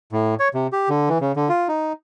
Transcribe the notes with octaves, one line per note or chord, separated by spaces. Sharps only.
A2
C#5
C3
G4
D3
E3
C#3
D3
F4
D#4